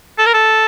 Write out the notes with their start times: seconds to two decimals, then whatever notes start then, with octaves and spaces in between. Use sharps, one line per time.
0.19 A4
0.26 A#4
0.34 A4